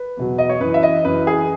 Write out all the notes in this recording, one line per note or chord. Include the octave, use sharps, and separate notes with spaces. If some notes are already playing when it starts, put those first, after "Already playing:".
Already playing: B4
E2 B2 F#3
D#5
C#5
F#2 E3 B4
E5
D#5
F#2 E3 B4
G#4